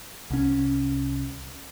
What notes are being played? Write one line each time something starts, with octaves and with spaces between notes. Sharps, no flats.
C2 C#4